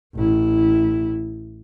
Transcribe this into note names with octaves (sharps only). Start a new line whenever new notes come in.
A1 E4